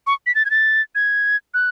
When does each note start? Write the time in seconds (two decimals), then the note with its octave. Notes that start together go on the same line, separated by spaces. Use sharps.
0.07 C#6
0.26 B6
0.35 A6
0.45 G#6
0.51 A6
0.95 G#6
1.54 F#6